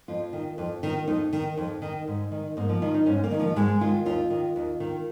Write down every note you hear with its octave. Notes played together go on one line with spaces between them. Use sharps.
F2 F4
D#3
F2
D#3
F2 D#4
D#3
F2
D#3
G#2
D#3
G#2 A#3
F3
D#3 F4
D#4
G#2 C#4
A#3
D#3
F3
G#2 G#3
D#3 F4
D#2 F4
D#3
D#2
D#3